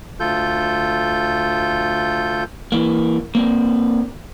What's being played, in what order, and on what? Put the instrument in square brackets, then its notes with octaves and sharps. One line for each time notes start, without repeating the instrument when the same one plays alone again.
[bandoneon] D2 F4 A4 G6
[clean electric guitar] E3 A#3
A#3 C4 D4